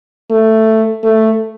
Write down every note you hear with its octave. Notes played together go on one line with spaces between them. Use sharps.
A3
A3